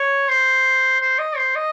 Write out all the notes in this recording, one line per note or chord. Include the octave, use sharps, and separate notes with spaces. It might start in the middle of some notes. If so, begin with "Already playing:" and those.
Already playing: C#5
C5
C5
D#5
C5
D#5